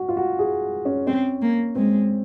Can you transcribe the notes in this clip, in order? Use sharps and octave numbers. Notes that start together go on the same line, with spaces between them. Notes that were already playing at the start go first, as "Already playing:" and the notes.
Already playing: F#4
F4
F#4
G#4
C#4
C4 C#4
A#3
G#3 C4